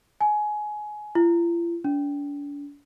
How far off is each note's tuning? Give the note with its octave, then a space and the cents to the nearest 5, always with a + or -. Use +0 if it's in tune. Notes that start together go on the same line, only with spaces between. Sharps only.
G#5 +20
F4 -45
D4 -40